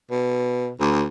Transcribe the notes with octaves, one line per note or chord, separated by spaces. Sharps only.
B2
D2